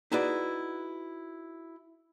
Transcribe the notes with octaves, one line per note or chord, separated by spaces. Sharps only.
D#4 E4 F#4 G#4 B4 D5